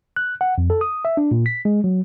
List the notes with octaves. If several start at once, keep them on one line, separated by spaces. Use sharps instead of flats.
F#6
F#5
F2
A4
D#6
E5
D4
A#2
B6
G#3
F#3